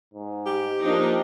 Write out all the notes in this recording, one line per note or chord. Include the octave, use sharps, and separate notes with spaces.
G#2
G4
F3 A#3 D4 D#4